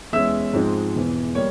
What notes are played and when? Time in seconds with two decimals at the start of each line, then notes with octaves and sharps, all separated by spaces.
0.12 E2 E3 G#3 C#4 E5 E6
0.53 G#2 F3 G#3 C4
0.95 E1 E2 E3
1.35 G3 A#3 C#5